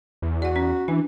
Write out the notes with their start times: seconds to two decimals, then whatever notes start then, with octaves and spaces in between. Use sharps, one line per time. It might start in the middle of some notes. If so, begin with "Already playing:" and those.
0.22 E2
0.42 F#4 D5 F#5
0.56 C#4
0.88 E3 D4